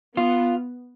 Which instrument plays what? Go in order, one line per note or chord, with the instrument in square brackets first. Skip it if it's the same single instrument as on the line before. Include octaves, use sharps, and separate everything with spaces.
[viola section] B3 [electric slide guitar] F4